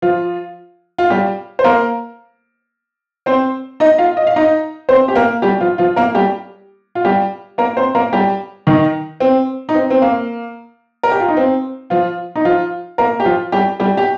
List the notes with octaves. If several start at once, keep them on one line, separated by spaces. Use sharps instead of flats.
F3 F4
F4
G3 G4
C5
A#3 A#4
C4 C5
D#4 D#5
F4 F5
D#5
F5
D#4 D#5
C4 C5
G4
A#3 A#4
G3 G4
F3 F4
F3 F4
A#3 A#4
G3 G4
F4
G3 G4
A#3 A#4
C4 C5
A#3 A#4
G3 G4
D#3 D#4
C4
D#4
C4
C4
A#3
A#4
G4
F4
D#4
C4
F3 F4
D#4
F3 F4
A#3 A#4
G4
F3 F4
G3 G4
G3 G4
G4